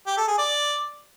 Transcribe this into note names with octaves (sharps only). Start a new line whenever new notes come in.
G4
A4
G#4
D5